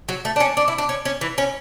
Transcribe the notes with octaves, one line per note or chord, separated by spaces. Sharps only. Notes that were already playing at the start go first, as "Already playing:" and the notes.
F#3
A3
D4
C#4
D4
E4
D4
C#4
C#4
E3
C#4